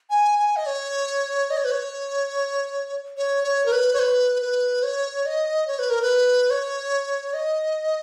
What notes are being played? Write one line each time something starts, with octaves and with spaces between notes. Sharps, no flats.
G#5
G#5
D#5
C#5
D#5
C#5
B4
C#5
C#5
C#5
A#4
B4
C#5
B4
B4
C#5
D#5
C#5
B4
A#4
B4
C#5
D#5